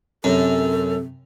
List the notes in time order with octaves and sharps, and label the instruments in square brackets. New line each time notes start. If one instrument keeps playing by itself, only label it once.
[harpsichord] F#2 [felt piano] C3 [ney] A4